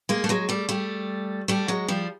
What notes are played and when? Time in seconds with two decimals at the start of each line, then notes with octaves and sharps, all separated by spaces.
0.09 G#3 A#3
0.24 A3
0.29 F#3 G#3
0.49 G3 A3
0.69 G3 A3
1.48 G3 A3
1.68 F#3 G#3
1.88 F3 G3